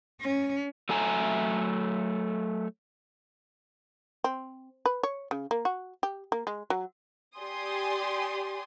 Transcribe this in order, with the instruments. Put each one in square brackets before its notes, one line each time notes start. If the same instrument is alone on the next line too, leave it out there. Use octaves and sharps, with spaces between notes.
[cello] C#4
[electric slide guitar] F#3 A3 A4 E5 G#5 A#5
[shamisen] C4
B4
C#5
C#3
A#3
F#4
G4
A#3
G#3
F#3
[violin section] G4 D5 G#5 C6 D#6